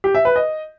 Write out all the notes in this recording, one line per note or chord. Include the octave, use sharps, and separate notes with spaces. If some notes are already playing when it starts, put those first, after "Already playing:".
G4
E5
B4
D#5